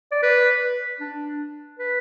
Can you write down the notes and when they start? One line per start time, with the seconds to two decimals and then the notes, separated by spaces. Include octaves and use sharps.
0.12 D5
0.23 B4
1.00 D4
1.79 B4